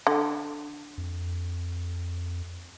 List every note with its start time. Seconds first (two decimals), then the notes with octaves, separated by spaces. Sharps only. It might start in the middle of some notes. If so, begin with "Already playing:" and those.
0.07 D3
0.98 F2